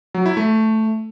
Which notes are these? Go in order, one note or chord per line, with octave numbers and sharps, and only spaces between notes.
F#3
E4
A3